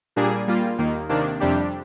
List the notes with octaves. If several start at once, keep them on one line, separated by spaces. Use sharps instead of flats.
A#2 G3 A#3 D4 G#4
G3 A#3 F4
D#2 D#3 A#3
C3 D#3 A#3 D4
F2 C3 G3 D4 G4